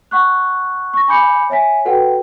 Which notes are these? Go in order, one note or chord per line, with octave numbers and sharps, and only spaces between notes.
F#5 C#6 F#6
C#6 A#6
G#5 B5 D6 G6 C#7
C#5 E5 G#5 B6
F#4 A4 B4 F#5 G5